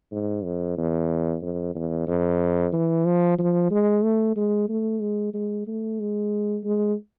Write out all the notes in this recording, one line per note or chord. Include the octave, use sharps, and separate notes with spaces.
G#2
F2
E2
F2
E2
F2
E3
F3
F3
G#3
A3
G#3
A3
G#3
G#3
A3
G#3
G#3